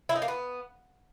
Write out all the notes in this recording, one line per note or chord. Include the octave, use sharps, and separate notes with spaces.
E4
D#4
A#3
B3